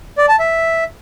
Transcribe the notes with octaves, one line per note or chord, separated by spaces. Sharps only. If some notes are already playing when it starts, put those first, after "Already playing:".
D5
A5
E5